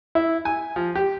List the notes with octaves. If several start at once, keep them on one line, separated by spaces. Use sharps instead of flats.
E4
G#5
F3
G4